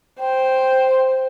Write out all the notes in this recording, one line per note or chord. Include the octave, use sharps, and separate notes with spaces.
C5 G5